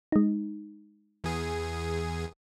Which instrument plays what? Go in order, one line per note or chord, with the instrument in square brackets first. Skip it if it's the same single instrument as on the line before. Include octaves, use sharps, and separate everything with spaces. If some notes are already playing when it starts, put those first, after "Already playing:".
[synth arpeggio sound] G#3 D#4
[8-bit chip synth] E2 G#4